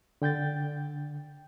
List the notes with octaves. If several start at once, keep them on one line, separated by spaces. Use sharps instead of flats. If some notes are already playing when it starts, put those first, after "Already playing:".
D3 G5 G6 A6